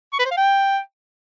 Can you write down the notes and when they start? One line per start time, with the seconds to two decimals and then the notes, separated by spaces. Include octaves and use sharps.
0.13 C#6
0.19 B4
0.25 C5
0.31 F5
0.37 G5